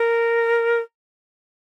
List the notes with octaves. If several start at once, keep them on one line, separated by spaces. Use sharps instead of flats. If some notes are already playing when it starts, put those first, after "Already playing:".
Already playing: A#4